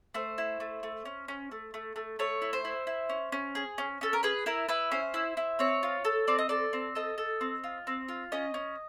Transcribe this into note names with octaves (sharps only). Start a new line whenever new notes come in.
A3 C5
E4
A3
A3
C#4
C#4
A3
A3
A3
A3 C#5
E4
C5
E4
E4
C#4
C#4
G#4
C#4
C#4 A4
A#4
G#4 B4
E4 A#4
E4 B4
C#4 C5
E4
E4
C4 C#5
F4
A4
C4 D5
D#5
A4 D5
C4
A4 D#5
A4
C4
F4
C4
F4
C#4 D#5
C#4